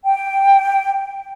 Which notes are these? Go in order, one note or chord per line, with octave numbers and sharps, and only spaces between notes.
G5